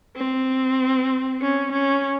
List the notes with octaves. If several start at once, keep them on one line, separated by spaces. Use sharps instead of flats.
C4
C#4
C#4